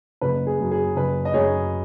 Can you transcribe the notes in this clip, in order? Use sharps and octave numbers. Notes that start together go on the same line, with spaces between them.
F#1 B4
G#4
F#2 F#3
G#4
F#1 B4
D#5
F#2 F#3 G#4 C#5